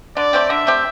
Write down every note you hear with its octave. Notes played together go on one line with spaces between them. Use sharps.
D3 D5
A3 C4 G4
D3 E5
A3 C4 G4